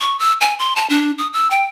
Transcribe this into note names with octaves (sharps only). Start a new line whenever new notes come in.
C#6
E6
G#5
C6
A5
D4
D#6
E6
G5